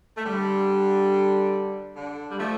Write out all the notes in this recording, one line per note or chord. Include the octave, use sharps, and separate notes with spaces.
A3
D3 G3
D3
G3
F3 A3